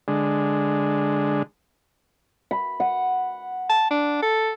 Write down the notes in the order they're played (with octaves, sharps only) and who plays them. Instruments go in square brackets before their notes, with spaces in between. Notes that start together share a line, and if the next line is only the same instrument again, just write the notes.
[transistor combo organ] D3 G#3
[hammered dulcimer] B5
F#5
[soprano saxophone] A5
D4
A4